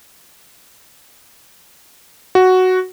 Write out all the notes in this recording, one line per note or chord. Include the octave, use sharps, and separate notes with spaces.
F#4